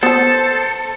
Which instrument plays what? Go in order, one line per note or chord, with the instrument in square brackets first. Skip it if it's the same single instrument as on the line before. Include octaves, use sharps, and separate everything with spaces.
[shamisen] B3 A5 [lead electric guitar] A4 [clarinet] C5